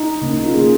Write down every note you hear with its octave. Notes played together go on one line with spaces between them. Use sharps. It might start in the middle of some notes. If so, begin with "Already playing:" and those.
Already playing: D#4
C#3 A#3 C#4
D#4
F4
C#3 A#3 C#4 G#4